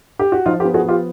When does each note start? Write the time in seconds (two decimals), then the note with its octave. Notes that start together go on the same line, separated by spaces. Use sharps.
0.19 G4
0.32 F#4
0.46 F3 D#4 F4
0.60 F4 G4
0.65 B3
0.74 F#4 G#4
0.84 F3 F4 G4